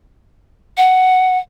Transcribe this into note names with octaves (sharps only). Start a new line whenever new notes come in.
F#5